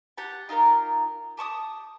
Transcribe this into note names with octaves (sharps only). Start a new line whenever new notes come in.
G4 F#5 A5
D#4 F4 G4 A#4
G4 A5 C#6 D#6